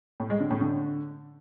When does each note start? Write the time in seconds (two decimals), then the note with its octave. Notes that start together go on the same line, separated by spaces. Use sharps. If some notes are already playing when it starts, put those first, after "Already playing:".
0.20 A2
0.30 G#3
0.40 D3
0.51 A2
0.61 D3